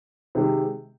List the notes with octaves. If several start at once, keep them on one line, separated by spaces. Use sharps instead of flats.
C3 D#3 G#3